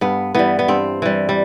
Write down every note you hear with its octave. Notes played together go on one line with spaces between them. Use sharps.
G2 B3
E3 G3 B3
B3
G2 C4
E3 G3
G3